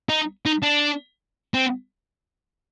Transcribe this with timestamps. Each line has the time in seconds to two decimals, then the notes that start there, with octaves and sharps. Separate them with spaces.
0.09 D#4
0.46 D#4
0.63 D4
1.54 C4